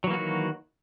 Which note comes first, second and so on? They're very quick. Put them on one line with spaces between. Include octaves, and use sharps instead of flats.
F#3 E3 A#3 F#4 D#3